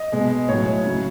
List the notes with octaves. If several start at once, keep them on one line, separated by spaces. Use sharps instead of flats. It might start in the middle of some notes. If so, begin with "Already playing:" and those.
Already playing: D#5
B2 G#3
A2 F#3 C#5
C#3 F#3